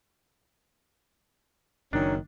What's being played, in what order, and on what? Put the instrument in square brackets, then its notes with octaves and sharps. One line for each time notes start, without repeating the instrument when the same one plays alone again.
[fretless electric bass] F#1 [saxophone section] D#3 F#3 C#4 [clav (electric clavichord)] D4